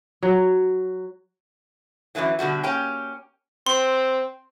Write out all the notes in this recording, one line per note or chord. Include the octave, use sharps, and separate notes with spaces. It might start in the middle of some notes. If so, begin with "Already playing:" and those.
F#3
F#2 A2 C#3 E3 F#3
B2 D3 G3 F#4
A#3 C#4 G4 G5
C4 C6